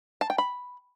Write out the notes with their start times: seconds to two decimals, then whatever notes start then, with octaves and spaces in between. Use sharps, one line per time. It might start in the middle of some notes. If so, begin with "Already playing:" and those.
0.21 A5
0.30 G5
0.38 B5